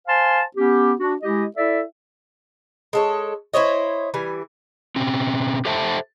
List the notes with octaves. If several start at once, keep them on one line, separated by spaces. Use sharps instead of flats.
C5 F5 G#5 A5 C6
B3 C#4 G4
D4 F#4
G#3 E4 G4 D#5
E4 A4 D5 E5
G#3 A4 C#5
E4 C5 C#5 D#5
E3 G3 G#5
B2 C4 C#4
G4 A4 C5 E5 G5 A5